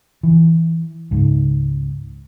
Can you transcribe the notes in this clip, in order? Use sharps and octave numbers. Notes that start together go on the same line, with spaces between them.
E3
C#2 G#2